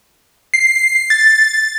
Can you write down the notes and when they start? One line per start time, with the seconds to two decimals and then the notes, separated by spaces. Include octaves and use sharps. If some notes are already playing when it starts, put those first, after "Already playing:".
0.54 C7
1.10 A6